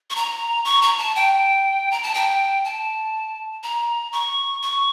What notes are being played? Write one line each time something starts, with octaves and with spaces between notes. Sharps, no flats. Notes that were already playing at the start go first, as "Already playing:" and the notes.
C#6
A#5
C#6
A#5
A5
G5
A#5
A5
G5
A5
A#5
C#6
C#6